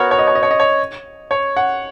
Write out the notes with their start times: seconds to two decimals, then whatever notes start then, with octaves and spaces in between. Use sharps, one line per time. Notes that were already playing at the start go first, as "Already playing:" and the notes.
Already playing: B3 F#4 A#4 C#5
0.11 C#5
0.19 D#5
0.27 C#5
0.35 D#5
0.43 C#5
0.51 D#5
0.60 C#5
1.31 C#5
1.57 F#5